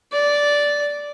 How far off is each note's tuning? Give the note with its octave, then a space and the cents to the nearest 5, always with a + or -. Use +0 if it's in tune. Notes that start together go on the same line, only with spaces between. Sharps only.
D5 -10